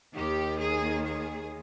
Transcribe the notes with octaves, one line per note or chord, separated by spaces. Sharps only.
D#2 D#3 G4
G#4
G#4